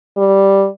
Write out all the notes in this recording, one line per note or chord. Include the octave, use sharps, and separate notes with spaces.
G3